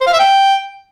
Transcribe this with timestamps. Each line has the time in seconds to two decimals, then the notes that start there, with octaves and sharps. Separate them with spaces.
0.01 C5
0.07 F5
0.13 E5
0.19 G5